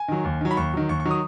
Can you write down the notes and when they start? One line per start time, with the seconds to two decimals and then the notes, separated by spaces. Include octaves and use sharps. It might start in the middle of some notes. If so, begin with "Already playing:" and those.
Already playing: G#5
0.08 D#3 F#3
0.24 D#2
0.41 D#3 F#3
0.51 B5
0.57 D#2 C#6
0.74 D#3 F#3
0.89 D#2 C#6
1.00 C#6
1.05 D#3 F#3
1.11 D#6